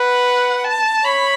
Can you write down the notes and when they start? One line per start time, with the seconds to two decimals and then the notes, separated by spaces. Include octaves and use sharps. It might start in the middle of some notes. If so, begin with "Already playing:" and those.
Already playing: B4 F#5
0.64 A5
1.04 C#5 B5